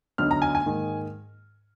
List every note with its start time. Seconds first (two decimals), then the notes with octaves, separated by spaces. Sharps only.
0.18 D2 D3 F#3 B3 D#4 F6
0.31 A#5
0.42 G#5
0.55 G#5
0.66 G#2 D#3 A#3